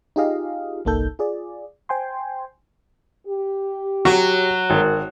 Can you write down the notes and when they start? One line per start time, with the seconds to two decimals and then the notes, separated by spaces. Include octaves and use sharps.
0.16 D#4 F4 G4 G#4 D#5 F5
0.85 G1 C2 A#3 D#4 A4 G6
1.19 F4 G#4 D5
1.89 C5 G5 G#5 C6
3.26 G4
4.05 F#3 F#4
4.70 G#1 A#4